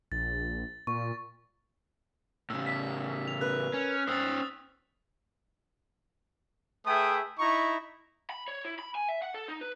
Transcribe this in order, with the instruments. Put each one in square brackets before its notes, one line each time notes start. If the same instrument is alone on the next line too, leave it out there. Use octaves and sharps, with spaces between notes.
[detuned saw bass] A#1 [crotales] A6
[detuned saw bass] A#2 [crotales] C#6
[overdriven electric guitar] A2 C#3 [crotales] E6
[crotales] B6
F7
[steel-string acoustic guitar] A#4 B4 [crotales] F#6
[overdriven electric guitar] C#4
[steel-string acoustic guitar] G2 [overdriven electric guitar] C#4 C5 [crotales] D#6 E6 A6
[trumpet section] A3 G#4 B4 E5 G5 D#6
D#4 E4 A#5 C#6
[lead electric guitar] B5
C#5
E4
B5
G#5
E5
F#5
A4
D#4
B4